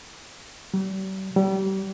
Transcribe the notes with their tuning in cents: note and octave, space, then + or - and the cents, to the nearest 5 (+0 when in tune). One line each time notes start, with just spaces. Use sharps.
G3 -40
G3 -30